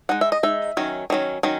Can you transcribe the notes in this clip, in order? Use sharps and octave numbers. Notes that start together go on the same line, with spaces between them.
G#3 D#4 F#5
E5
D#5
G#3 D#4 E5
D#3 F#3 C#4
D#3 F#3 C#4
D#3 F#3 C#4